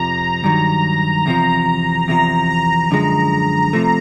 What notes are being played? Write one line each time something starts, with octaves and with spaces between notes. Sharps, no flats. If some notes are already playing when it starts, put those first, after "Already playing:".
Already playing: F2 C3 F3 A#5
G2 D#3 F#3
E2 C3 F3 A#5
E2 C3 F3 A#5
A#5
F#2 D3 F3 G#3
C3 F3 A3